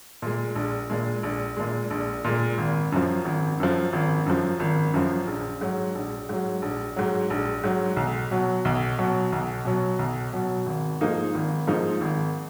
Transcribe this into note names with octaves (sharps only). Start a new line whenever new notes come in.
A#2 G#3
A#1
A#2 G#3
A#1
A#2 G#3
A#1
A#2 G#3
G#1
F#2 F3
G#1
F#2 F3
G#1
F#2 F3
G#1
F#2 F3
A#1
G#2 F#3
A#1
G#2 F#3
A#1
G#2 F#3
A#1
G#2 F#3
B1
B2 F#3
B1
B2 F#3
B1
B2 F#3
B1
B2 F#3
G#1
G#2 F3 A#3 D#4
G#1
G#2 F3 A#3 D#4
G#1